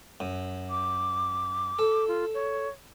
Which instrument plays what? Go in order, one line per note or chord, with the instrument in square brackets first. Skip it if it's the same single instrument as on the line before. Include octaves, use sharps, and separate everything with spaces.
[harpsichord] F#2
[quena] D6
[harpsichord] A4
[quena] F4
C#5